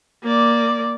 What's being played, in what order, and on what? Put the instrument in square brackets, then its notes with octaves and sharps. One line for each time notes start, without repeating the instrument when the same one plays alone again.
[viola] A#3 D5